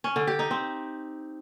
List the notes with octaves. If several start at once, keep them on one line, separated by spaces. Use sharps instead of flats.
C#4
D3
G4
D#4
C4